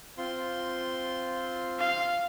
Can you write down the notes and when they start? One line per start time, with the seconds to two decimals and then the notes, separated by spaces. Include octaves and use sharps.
0.18 C4 F4 C6
1.79 F5